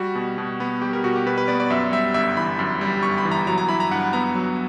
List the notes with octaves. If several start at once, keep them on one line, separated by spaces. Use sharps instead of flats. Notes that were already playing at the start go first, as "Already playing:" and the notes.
Already playing: G3 F#4
B2
B2
B3
G3 G4
A#4
B2 F#4
G4
B2 B4
B4
B3 D5
D5
F#2 E5
G3 E5
G1 E5
E3 B5
F#2
G3
G1 C#6
B5
E3
A#5
F#3 A#5
A#5
E4 B5
A#5
G2 F#5
B3 A#5
F#3